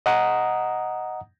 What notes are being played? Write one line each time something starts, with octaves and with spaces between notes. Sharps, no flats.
D#5 F#5 A#5 D#6